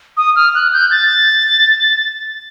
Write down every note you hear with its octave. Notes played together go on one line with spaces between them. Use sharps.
D#6
F6
F#6
G6
A6